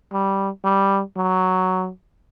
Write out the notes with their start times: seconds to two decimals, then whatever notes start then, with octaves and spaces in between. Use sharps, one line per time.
0.13 G3
0.64 G3
1.17 F#3